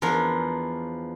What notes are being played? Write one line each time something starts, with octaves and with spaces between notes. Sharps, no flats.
E2 F3 D4 A#4